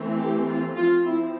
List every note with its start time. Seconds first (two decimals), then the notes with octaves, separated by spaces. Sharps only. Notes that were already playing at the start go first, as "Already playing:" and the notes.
Already playing: E3 A3 C4
0.18 G4
0.47 F4
0.77 F3 C4 F4
1.06 E4